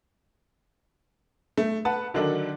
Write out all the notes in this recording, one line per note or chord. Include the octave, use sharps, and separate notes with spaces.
A3
B4 F#5 A5
D3 D#3 F#3 D4 D#4 A4